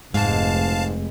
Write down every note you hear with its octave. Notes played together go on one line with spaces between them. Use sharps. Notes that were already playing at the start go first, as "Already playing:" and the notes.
F1 G#2 G#3 F5 A5